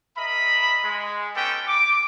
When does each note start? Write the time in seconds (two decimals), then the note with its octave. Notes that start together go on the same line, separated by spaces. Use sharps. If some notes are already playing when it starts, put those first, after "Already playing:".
0.17 A#4 D#5 E5 B5
0.84 G#3
1.36 B3 C#4 G4 A4 B4 G5
1.68 D6